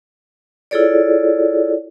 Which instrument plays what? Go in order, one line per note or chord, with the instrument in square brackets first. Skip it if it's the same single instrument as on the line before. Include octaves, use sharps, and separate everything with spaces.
[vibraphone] E4 F4 G#4 A4 C#5 D5